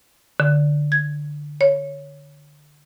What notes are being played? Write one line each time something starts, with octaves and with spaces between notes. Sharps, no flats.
D3
G#6
C#5